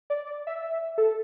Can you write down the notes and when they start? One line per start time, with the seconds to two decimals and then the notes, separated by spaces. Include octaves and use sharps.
0.10 D5
0.47 E5
0.98 A4